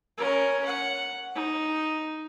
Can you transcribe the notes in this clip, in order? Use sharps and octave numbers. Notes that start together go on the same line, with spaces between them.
C#4 A#4
F#5
D#4